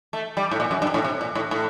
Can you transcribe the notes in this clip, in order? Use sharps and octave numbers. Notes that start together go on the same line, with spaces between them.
A3
G3
A2
A#2
F#2
G2
A2
C3
A#2
A2
A2